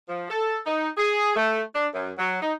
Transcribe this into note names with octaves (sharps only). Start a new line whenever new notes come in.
F3
A4
D#4
G#4
A3
D4
F#2
F#3
D#4